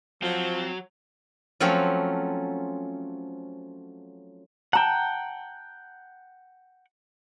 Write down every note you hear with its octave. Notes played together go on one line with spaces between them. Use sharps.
F3 F#3 C4
F3 F#3 A3 C4 C#4
F#5 G5 A5 A#5